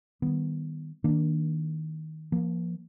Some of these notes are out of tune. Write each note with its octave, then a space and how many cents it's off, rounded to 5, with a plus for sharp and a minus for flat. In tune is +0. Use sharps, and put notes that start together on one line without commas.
D#3 +5 G3 +0 B3 +0
D#3 +15 A#3 +0 D4 +0
F3 -20 A#3 +20